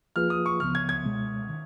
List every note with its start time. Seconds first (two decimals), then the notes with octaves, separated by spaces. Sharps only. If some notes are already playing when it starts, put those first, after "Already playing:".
0.16 F3 A#3 F4 G#4 B4 F6
0.30 D#6
0.46 C#6
0.60 C#2 C#3 F3 B3 F6
0.75 G#6
0.89 G#6
1.04 C#2 B2 G#3
1.49 D#3